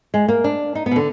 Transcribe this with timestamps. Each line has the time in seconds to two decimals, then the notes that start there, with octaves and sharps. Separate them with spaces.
0.14 G#3
0.28 A#3
0.44 D4
0.75 D#4
0.86 B3
0.91 B2
0.96 D3